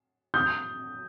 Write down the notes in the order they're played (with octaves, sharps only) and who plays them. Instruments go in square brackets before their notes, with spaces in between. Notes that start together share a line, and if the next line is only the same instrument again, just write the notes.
[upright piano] D#6 G6